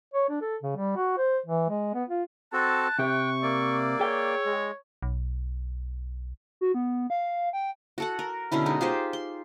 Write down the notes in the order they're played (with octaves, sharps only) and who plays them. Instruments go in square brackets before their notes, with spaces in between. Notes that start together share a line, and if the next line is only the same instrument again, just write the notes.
[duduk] C#5
D4
A4
C#3
G3
F#4
C5
E3
G#3
B3
F4
[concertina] C4 F#4 A4 [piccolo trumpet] A5 [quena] F#6
[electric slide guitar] C3 G4 [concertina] G5 [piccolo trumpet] C#6
[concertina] A#3 D5 [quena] E6
[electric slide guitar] G#4 G5 [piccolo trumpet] C#5
[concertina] G#3
[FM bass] B1
[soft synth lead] F#4
B3
F5
G5
[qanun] F#4 A4 F#5
A#4
B2 D3 C#4 E4
G#3 D#4
F4 G4 G#4 C5
C6